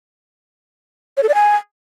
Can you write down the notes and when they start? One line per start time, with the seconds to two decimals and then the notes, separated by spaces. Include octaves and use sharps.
1.17 C#5
1.23 A4
1.29 D5
1.34 G#5